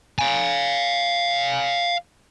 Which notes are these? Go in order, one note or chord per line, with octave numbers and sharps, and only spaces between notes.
F5 G#5